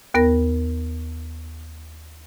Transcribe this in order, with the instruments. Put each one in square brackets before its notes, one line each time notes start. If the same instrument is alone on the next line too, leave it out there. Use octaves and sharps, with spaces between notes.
[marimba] D#2 B3 A#4 A#6